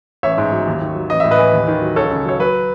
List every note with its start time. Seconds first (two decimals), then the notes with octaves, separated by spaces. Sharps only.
0.23 A1 C#5 E5
0.38 G#2
0.52 F#3
0.67 D#2
0.81 D#3
0.95 F#3
1.10 A1 D#5
1.20 A2 E5
1.31 B4 D#5
1.39 E3
1.53 D#2
1.68 D#3
1.82 F#3
1.96 C#2 A4 C#5
2.11 C#3
2.25 F#3 C#5
2.40 F#3 B4